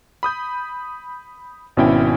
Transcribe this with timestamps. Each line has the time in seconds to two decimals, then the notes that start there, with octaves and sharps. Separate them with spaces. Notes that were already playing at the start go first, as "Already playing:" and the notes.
0.23 B5 D#6 G6
1.77 G#1 B2 C#4 E4 G5